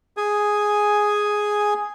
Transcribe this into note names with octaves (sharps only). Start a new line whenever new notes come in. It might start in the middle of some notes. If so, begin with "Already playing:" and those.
G#4 G#5